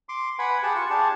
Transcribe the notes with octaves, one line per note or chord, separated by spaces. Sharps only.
C6 D6
B4 F#5 G#5 B5
G4 G#4 F#5 G#5 A5
F4 C#6
D4 G4 G#4 A5